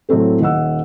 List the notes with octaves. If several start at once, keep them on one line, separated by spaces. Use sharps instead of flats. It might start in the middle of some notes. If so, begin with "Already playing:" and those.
A2 F#3 A3 C4 A4
D#1 D#5 F#5 E6